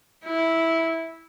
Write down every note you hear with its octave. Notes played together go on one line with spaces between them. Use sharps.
E4